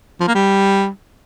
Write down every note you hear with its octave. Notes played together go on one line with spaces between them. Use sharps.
F3
A#3
G3